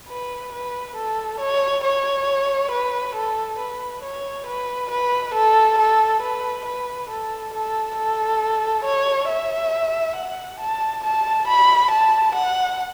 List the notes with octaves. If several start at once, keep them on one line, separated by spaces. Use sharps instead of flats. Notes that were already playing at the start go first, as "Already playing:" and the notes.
B4
B4
A4
C#5
C#5
B4
A4
B4
C#5
B4
B4
A4
A4
B4
B4
A4
A4
A4
C#5
E5
F#5
A5
A5
B5
A5
F#5